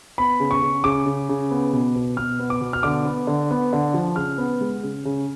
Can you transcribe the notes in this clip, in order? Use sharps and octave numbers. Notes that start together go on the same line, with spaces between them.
B3 B5
C#3
C#6
C#3
C#3 D6
C#3
C#3
B3
B2
B2
B2 F6
B3
D6
B2
F6
D3 D6
B3
D3
B3
D3
F3
C#3 F6
B3
G#3
C#3
C#3